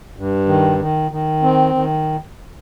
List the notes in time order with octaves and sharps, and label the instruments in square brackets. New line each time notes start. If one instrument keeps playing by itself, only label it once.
[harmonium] G2
D#3
D#3
D#3
C4
D#3